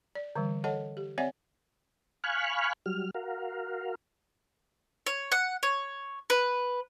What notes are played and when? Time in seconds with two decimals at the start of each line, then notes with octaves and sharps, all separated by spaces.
0.15 D5
0.36 D3 E3 G3
0.64 A4 C#5 D#5 F#5 A5
0.97 G4
1.18 C4 C#5 D5 E5 F#5 G#5
2.24 F5 G#5 B5 C#6 F6 F#6
2.86 F#3 G3 F6
3.14 F#4 A#4 F5
5.06 C#5
5.32 F#5
5.63 C#5
6.30 B4